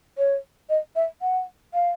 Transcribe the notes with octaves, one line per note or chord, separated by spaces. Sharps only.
C#5
D#5
E5
F#5
F5